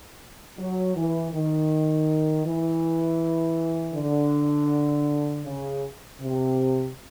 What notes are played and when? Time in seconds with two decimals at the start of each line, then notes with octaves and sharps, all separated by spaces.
0.58 F#3
0.96 E3
1.33 D#3
2.45 E3
3.94 D3
5.44 C#3
6.20 C3